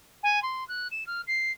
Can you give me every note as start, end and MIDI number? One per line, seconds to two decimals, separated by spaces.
0.23 0.42 80
0.42 0.66 84
0.68 0.88 90
0.91 1.06 100
1.07 1.21 89
1.27 1.51 96